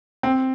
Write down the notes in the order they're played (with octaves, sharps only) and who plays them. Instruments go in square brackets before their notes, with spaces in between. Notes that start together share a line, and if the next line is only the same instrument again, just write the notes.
[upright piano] C4